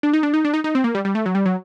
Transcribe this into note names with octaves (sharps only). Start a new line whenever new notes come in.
D4
D#4
D4
D#4
D4
D#4
D#4
C4
A#3
G3
G3
A3
F#3
G3
F#3